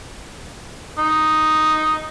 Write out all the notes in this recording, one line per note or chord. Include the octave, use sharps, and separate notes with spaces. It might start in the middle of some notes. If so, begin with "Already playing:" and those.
D#4